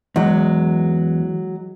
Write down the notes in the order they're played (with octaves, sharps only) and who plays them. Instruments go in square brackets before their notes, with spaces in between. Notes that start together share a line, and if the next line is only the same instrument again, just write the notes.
[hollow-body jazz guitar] E2 [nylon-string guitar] F#3 G#3